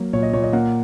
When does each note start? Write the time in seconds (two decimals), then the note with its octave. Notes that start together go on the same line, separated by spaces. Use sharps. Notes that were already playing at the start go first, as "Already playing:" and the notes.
Already playing: F#3 A#3
0.13 A#2 C#5
0.23 D#5
0.33 A#2 C#5
0.44 D#5
0.53 A#3 F#5